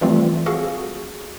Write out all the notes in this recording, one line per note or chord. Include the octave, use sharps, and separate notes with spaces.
E3 F3 G3 A3 C4 F4
F#4 G#4 A4 F5